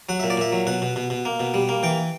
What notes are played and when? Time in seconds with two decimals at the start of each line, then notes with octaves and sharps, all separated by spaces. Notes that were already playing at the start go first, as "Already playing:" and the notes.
0.09 F#3 F#5
0.20 A#2 E5
0.30 D5
0.37 A#2 E5
0.52 F#3
0.67 B2 F#5
0.82 B2
0.96 B2
1.10 B2
1.25 A#3
1.40 B2
1.54 G3
1.69 A#3
1.83 E3 G5